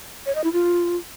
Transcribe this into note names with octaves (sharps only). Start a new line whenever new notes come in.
C#5
D#5
E4
F4